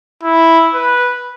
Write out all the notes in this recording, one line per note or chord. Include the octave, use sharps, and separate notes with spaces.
E4
B4